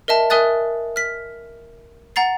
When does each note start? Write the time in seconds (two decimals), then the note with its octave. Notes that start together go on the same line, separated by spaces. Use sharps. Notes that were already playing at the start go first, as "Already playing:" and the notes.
0.08 A#4 D#5 E5 A5
0.30 A#4 E5 G#5 D#6 F#6 A6
0.96 F6 B6
2.16 F#5 A#5 A6 C7